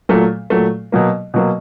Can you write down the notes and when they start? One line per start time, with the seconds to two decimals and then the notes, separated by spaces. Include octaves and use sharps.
0.09 A#2 F#3 A3
0.50 A#2 F#3 A3
0.92 B2 F#3 A#3
1.34 B2 F#3 A#3